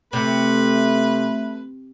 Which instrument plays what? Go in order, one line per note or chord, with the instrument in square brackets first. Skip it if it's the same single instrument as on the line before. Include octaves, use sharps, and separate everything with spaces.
[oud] C3 [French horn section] A3 [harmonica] B4